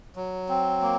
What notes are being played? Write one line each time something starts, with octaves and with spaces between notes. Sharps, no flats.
F#3
C4
A#3